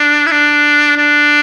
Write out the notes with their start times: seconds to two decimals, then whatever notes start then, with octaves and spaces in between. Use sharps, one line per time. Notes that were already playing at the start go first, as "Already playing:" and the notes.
Already playing: D4
0.26 E4
0.31 D4
0.97 D4